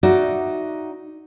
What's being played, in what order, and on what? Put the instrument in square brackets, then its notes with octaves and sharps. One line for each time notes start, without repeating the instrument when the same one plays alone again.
[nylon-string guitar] D#4 F#4 D5 E5